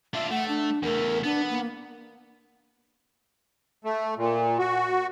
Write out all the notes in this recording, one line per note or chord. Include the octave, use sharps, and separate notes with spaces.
D4 F4 E5
A3 F#5
D4
E2 A3 A#4
B3 D4
A#3
A3
A#2
F#4